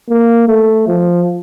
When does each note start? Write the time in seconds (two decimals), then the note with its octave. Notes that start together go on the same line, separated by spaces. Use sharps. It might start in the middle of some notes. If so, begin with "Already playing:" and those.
0.09 A#3
0.48 A3
0.87 F3